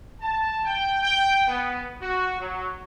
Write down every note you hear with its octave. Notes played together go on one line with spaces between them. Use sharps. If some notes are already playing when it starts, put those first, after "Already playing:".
A5
G5
G5
B3
F#4
F#3